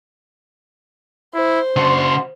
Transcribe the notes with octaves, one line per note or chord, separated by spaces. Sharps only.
E4 C5
C#3 D4 F#4 C6